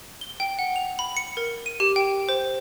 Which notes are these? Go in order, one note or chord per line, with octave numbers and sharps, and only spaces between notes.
G7
G5
F#5
F7
B5
C#7
A#4
D#7
G4
G5
C5